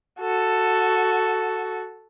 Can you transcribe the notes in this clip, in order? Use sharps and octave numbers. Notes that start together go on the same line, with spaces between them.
F#4 A4